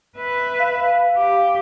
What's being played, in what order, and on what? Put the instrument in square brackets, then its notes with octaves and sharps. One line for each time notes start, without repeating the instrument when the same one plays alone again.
[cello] B4 E5
[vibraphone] F5
[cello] G4